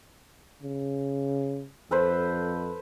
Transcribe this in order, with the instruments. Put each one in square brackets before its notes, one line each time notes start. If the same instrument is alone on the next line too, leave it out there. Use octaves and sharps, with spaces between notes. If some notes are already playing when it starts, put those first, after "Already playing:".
[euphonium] C#3
[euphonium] F2 [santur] A4 B4 C5